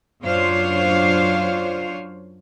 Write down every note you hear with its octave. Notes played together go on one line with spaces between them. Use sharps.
F#2 D4 F4 C5 C#5 F5